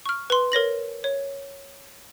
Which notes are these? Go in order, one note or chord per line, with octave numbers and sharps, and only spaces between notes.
C#6 F6
B4 C6
A#4 C#5 A#6 F#7
C#5